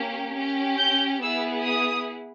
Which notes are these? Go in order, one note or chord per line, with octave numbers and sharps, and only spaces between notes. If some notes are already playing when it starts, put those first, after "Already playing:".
Already playing: A#3 C#4 G4
C#4 G4
G6
B3 E4 G#4 E6
D#6